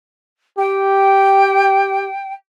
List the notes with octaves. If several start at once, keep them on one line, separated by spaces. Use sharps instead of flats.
G4 G5